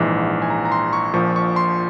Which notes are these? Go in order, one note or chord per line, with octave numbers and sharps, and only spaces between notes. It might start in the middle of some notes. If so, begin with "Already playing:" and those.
Already playing: A#1 G#2 E3
G#5
A#5
A#5
C6
C#6
A#1 A#2 F3 C#6
C#6
C6